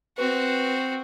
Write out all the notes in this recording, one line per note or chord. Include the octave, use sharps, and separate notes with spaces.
C4 F#4 B4